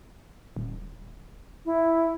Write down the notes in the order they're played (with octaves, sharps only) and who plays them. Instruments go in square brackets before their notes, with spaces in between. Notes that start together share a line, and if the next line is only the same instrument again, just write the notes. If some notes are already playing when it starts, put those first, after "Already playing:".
[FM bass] D#1
[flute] E4